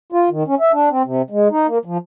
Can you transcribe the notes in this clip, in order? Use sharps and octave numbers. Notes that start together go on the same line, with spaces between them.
F4
D#3
C#4
E5
D4
C4
C3
G#3
D#4
A#3
F3